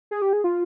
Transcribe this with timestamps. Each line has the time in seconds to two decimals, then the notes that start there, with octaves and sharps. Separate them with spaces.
0.11 G#4
0.22 G4
0.33 G#4
0.44 F4